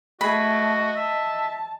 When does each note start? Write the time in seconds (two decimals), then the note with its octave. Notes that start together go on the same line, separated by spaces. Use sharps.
0.21 A3 F#4 G#4 D#5 B5
0.96 E5 A5